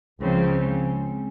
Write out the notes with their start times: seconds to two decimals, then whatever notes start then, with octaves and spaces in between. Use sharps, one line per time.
0.20 C#2 C#3 F3 C4 C#4
0.51 C4
0.62 G#3